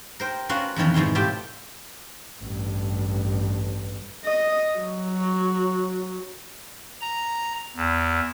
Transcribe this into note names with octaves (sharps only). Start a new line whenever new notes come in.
A#4 C5 G5
C#4 F4 F#4 A#4 B4 F5
F2 B2 D#3 E3 C#4
E2 G#2 B2 G#4 C6
A2 F4 G4 E5 G5
A1 G2
D#5
F#3
A#5
E2